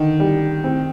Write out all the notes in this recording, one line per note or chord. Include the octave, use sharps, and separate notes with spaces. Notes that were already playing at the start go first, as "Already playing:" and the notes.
Already playing: D3 D#3
G3
C4